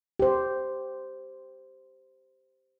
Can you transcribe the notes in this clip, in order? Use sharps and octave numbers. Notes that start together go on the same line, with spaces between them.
G4 C5